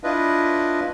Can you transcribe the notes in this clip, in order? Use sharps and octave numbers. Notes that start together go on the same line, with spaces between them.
D4 E4 F4 B4 D#5